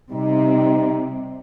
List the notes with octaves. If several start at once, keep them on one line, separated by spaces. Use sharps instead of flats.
C3 G3 D#4